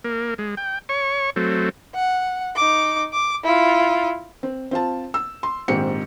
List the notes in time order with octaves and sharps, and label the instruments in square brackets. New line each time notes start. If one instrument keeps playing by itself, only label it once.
[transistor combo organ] A#3
G#3
G5
C#5 C#6
F#3 A3 C4
[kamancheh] F#5
D#4 D6
D6
E4 F4
[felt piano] C4
C4 F4 A5
E6
C6
A#1 G#2 D#3 C4 G4 C#7